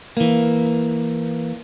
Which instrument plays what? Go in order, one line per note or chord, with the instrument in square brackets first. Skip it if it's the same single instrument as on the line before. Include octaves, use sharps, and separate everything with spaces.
[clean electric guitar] E3 A#3